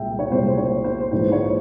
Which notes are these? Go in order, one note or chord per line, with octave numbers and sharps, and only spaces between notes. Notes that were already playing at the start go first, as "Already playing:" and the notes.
Already playing: C2 A#2 G#3 E5 G5
C#5
C2 A#2 G#3 C5
C#5
C5
A#1 G#2 E3 G#3 C5
C#5